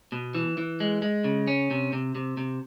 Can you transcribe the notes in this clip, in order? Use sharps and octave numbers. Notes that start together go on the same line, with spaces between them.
B2
E3
E3
G#3
G#3
C#3
C#4
C3
C3
C3
C3